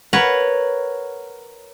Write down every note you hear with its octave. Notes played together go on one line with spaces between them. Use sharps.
A#4 B4 C#5 F#5